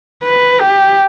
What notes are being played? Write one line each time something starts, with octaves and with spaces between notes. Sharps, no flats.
B4
G4